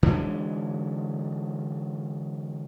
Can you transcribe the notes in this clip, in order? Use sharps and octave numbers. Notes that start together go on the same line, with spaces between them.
D3 E3 F#3 G#3